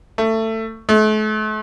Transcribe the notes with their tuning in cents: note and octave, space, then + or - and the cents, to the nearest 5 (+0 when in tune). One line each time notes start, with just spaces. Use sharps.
A3 +20
A3 -40